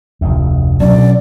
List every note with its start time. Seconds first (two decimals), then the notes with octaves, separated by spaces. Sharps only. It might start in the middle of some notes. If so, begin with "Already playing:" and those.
0.21 F1 D2
0.80 B2 F#3 C#4 D4 D5